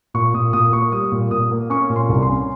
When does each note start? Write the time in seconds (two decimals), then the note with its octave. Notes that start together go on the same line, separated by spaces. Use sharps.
0.14 A#2 C#6
0.34 A#2 D#6
0.53 A#2 D#6
0.73 A#3 C#6
0.92 G3 D#6
1.12 A#2
1.31 A#2 D#6
1.51 A#3
1.70 C#4 C#6
1.90 A#2
1.96 C6
2.09 C2
2.22 C6
2.29 C#4